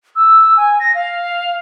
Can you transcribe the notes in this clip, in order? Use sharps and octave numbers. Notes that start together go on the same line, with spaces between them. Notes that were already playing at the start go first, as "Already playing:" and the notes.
E6
G#5
A#6
F5